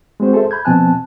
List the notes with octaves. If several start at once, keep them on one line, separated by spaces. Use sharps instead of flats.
G#3 C4 F#4 C5
G#4 A4 C5 E5
B5 G6 G#6
B2 F3 C4 G#5 A5 F#6